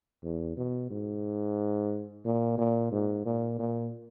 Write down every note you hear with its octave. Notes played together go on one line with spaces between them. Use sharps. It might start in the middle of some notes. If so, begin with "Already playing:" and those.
E2
B2
G#2
A#2
A#2
G#2
A#2
A#2